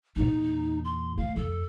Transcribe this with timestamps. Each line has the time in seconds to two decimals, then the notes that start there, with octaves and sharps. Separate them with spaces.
0.16 E2 A#2 D#4
0.84 C6
1.18 A3 F5
1.36 F2 A4